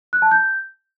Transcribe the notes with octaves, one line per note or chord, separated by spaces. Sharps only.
F#6
A5
G6